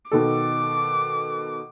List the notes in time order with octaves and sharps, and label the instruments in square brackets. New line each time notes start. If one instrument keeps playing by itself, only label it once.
[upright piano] B2 D#3 A4 [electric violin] D6